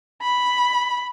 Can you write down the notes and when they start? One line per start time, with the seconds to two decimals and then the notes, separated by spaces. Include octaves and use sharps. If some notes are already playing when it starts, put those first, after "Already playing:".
0.22 B5